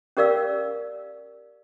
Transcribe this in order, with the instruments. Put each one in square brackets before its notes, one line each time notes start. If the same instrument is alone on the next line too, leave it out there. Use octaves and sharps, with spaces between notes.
[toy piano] C#4 G4 A#4 D5 F5 E6